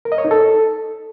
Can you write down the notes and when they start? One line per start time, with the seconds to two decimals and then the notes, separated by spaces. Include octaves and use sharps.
0.05 A#4
0.12 D#5
0.18 C#5
0.25 D#4
0.31 A4